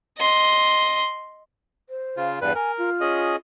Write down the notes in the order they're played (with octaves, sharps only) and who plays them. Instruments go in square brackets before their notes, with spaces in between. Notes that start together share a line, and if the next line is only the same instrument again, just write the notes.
[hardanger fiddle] D#5 C6
[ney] C5
[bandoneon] C#3 F4
[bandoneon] E2 G2 B4 [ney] D5
[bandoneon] A#4 [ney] G#5
[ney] F4
[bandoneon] C#4 G#4 D#5